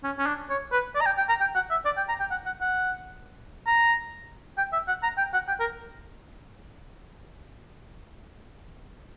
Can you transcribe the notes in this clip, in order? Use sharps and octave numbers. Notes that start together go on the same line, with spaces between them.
C#4
C#4
D4
C#5
B4
D5
A#5
G5
G5
A#5
G5
F#5
E5
D5
G5
A#5
G5
F#5
F#5
F#5
A#5
G5
E5
F#5
A#5
G5
F#5
G5
A#4